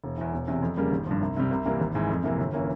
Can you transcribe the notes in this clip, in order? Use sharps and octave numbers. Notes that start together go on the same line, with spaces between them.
E1
E2 E3
E1
E2 C3
F2
C#3 G3 A#3
G#1
G2 F3
C2
C3 G3
C2
C3 E3 G3 A#3
G#1
G#2 E3
F2
C3 E3 A#3
G1
E3 A#3 C#4